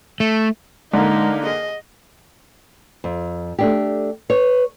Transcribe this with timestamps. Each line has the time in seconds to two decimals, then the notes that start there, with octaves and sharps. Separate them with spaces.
0.20 A3
0.93 D3 G#3 A#3 D#4 A#5
1.47 G#4 D#5
3.04 F2
3.59 A3 D4 G4
4.30 B4 C#5